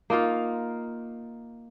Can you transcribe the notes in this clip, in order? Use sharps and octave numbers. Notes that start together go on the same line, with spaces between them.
A#3 D#4 F4 F5